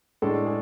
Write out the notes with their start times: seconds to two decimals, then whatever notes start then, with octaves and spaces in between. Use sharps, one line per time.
0.22 A2 G#3 D4 A4
0.46 G#4